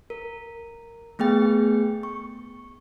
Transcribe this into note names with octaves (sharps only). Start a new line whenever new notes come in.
A#4
A3 B3 G#4 G5
C#6